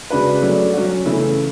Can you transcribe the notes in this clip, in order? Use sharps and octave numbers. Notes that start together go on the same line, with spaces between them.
C#3 G#3 D4 F#4 B4
F#3 A3 D4
F#3 C#4 F#4
C#3 E3 A3 E4